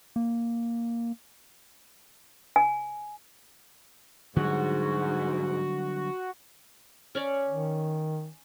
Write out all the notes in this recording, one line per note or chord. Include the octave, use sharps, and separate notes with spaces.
A#3
G#5
G#2 D3 F#3 G3 F#4
C#4 C#5 D5
D#3